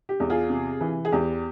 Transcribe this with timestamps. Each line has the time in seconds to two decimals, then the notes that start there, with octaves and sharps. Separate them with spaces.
0.09 G4
0.20 E2
0.30 F4 G#4
0.50 C3
0.81 E3
1.05 G#4
1.12 E2 G4